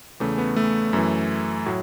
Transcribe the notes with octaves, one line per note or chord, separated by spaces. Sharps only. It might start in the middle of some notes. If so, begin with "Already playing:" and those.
E2 C#3 E3 A3
B3
A3
F#2 E3
A2 F#3